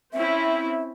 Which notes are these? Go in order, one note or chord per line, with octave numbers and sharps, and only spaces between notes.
C4 C#4 E4 E5